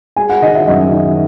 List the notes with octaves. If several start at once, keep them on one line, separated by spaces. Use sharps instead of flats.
G#3 G#5
F#5
D#3 D#5
E5
F#2 D#5
D#3